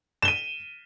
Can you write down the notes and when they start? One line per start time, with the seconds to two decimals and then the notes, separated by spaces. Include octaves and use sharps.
0.22 E7
0.25 G7
0.28 D#7